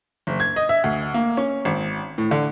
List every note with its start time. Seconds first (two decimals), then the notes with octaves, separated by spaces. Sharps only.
0.27 F#1
0.40 G#6
0.56 D#5
0.69 E5
0.84 D2
1.14 A#3
1.37 C#4
1.65 G#1
2.18 A2
2.31 D3